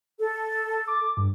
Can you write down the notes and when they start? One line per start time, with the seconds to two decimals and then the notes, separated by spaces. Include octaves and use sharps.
0.18 A4
0.87 D6
1.17 G2